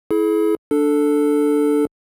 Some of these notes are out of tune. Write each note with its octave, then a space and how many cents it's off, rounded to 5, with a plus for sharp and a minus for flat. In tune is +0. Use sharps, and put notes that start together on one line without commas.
E4 -10 G#4 +40
D4 +0 A4 +5